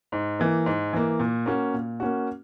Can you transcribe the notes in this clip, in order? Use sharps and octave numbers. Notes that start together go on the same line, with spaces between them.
G#2
E3 A#3
G#2
E3 A#3
A#2
A#3 C#4 F#4
A#2
A#3 C#4 F#4